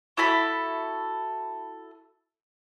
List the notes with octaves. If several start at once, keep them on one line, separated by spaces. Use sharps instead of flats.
E4 F#4 A4 B5